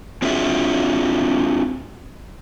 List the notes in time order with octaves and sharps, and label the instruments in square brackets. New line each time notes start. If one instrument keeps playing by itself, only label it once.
[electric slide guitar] C4 D4 F4 F#4 G#4 E5